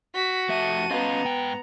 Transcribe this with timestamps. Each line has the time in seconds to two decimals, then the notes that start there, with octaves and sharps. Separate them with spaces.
0.14 F#4 B6
0.49 F2 A3 E5 A5 D#7
0.91 B3 C#4 D#5 F5 A#5
1.25 G#2 G5